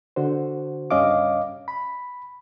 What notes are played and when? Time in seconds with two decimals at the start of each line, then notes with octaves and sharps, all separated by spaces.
0.16 D3 F#4 C5
0.91 C#2 G2 C#4 D#5 F5 D6
1.68 B5